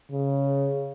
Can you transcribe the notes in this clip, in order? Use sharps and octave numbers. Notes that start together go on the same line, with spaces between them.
C#3